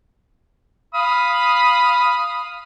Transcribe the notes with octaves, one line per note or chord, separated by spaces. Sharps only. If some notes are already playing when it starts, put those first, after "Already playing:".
F5 B5 D#6